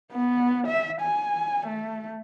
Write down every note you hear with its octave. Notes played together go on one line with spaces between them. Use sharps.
B3
E5
G#5
A3